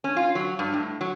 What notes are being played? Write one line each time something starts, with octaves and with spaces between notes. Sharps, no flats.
C#4
F4
F#3
G2
A2
F#3